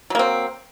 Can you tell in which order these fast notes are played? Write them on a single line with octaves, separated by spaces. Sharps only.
F#3 A#3 C4